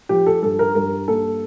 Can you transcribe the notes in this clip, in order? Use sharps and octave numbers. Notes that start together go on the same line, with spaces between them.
F3 G4
A4
G2 A4
A#4
G2 A#4
A#3 A4